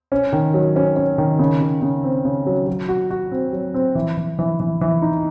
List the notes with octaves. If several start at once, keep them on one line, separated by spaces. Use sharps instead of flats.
C#4
D#3
F#3
C#4
C#4
D#3
C#3
C#3
C#3
C4
C#3
F#3
F#3
F#4
F#4
C4
F#3
C4
E3
E3
E3
E3
E3
D#4